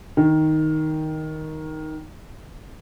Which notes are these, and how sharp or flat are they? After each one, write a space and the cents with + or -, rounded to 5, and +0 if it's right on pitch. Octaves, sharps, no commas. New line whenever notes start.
D#3 +5